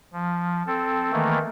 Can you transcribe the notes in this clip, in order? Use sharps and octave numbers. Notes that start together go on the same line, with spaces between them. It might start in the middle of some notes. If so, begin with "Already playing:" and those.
F3
C4 A4
D#3 E3 A3 A#3